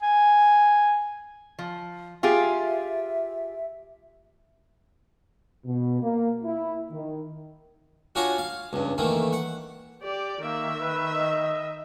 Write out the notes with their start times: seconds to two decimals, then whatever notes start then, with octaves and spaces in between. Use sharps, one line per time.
0.02 G#5
1.59 F3
2.23 F4 G4 G#4 E5
5.66 B2
6.01 A#3
6.44 E4
6.91 D#3
8.15 D4 F4 F#4 C#5 G#5 A#5
8.38 F5
8.73 C#2 G2
8.98 D#3 E3 A3 A#3
9.33 F#5
10.02 G4 D5
10.44 D#3 A#3 E5
10.80 B4
11.15 D#5